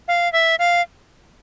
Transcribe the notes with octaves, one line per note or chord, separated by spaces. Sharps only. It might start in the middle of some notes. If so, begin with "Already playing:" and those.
F5
E5
F5